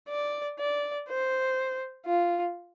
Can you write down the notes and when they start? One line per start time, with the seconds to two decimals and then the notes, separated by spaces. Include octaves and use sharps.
0.09 D5
0.59 D5
1.09 C5
2.06 F4